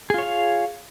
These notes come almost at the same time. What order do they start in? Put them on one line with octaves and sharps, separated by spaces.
G#4 F4 C#5 F5